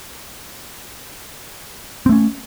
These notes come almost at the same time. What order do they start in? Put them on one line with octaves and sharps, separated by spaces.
C4 A3 C#4